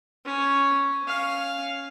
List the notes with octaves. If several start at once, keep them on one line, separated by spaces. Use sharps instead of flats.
C#4
C#4 F5